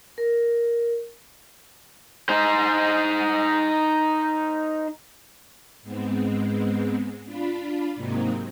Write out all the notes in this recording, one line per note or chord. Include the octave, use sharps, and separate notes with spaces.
A#4
D#4 C5
G#2 G#3 B3 C4
D4 F4 B5
G#2 C3 F#3 A#3 C4 D#4